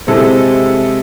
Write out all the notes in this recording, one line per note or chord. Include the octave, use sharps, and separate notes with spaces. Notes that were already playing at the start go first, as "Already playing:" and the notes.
C3 G#3 C4 E4 A4